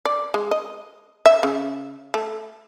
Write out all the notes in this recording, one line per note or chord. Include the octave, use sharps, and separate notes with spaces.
D5
G#3
D#5
E5
C#3
A3